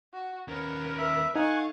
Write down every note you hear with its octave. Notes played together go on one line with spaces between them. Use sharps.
F#4
D#2 C#4 A#4 B4
E5
D#4 A4 F5 F#5 G#5 C#6